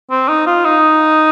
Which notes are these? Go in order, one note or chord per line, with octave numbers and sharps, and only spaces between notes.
C4
D#4
F4
D#4